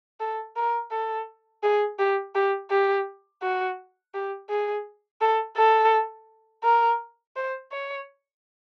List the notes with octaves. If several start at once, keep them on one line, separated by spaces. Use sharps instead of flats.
A4
A#4
A4
G#4
G4
G4
G4
F#4
G4
G#4
A4
A4
A#4
C5
C#5